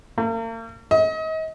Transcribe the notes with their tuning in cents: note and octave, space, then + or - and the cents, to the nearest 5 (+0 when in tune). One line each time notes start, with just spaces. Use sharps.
A#3 -40
D#5 +35